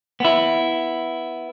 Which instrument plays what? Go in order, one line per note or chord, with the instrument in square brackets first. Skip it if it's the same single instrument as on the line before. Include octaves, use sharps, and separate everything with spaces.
[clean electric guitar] B3 E4